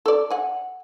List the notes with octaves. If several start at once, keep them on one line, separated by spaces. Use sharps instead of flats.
A4 D5
F#5 G#5